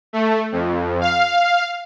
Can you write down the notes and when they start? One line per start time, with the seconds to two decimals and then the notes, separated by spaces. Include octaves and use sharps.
0.13 A3
0.52 F2
1.01 F5